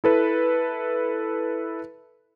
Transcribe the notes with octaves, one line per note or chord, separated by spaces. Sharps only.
E4 A4 B4